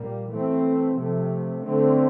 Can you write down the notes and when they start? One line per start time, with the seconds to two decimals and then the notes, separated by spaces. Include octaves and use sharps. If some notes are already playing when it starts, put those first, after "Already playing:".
Already playing: A#2 G3 A#3
0.29 E3 A3 C4
0.96 C3 F3 A3
1.63 D3 A3 C4